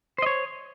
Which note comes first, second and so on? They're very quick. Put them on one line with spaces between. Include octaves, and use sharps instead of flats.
C5 D#5 C#5